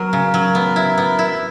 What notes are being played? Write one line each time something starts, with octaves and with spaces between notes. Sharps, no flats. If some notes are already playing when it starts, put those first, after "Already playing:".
Already playing: F#3 B3 A#4
C#3
F#3
B3
E4
B3
E4